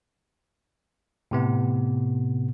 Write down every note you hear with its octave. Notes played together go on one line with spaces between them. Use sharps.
A2 C3 B3